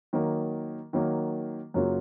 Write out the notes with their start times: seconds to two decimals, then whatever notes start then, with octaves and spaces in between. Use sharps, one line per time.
0.13 D#3 F#3 A#3
0.93 D#3 F#3 A#3
1.74 F#2 C#3 F#3 A#3 F4